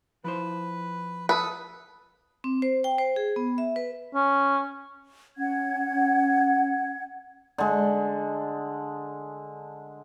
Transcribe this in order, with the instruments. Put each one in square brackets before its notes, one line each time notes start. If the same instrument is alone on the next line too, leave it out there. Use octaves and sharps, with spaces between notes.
[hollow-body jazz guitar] F3 E4 C5 [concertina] B4
[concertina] A4 D#6 [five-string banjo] B4
[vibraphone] C4
C5
G5
C5
G#4
B3
E5
B4
[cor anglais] C#4
[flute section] C#4 F#5 G#6
[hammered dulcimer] D3 G#3